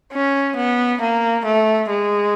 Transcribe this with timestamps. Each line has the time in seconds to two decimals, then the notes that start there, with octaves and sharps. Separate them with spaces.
0.13 C#4
0.57 B3
1.01 A#3
1.45 A3
1.90 G#3